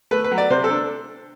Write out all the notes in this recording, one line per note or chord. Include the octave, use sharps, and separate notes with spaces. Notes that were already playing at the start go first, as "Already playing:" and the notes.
A3 B4
B4
F#3
D5
C3 C5
A4
D4